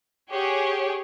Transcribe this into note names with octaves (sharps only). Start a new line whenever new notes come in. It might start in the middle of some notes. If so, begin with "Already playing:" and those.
G4 G#4 C#5 F#5